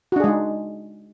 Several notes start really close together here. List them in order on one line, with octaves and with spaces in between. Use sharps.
F#4 D4 G#4 G#3 D#4